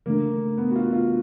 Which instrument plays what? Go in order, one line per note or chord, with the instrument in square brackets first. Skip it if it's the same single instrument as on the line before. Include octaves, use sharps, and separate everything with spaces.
[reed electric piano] C#3 E3 A3 D4 [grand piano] A#3
[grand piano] B3
F#4
F4
F4